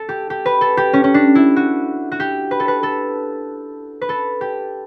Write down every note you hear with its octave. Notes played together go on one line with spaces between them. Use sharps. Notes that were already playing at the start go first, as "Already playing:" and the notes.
Already playing: A4
G4
G4
B4
A4
G4
C#4
C#4
D4
E4
F#4
F#4
G4
B4
A4
B4
A4
B4
A4
G4